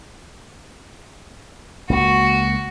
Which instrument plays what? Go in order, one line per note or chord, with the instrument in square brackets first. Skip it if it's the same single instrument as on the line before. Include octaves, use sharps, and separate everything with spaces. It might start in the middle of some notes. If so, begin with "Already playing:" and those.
[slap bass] C#2 A#3 [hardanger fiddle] F#4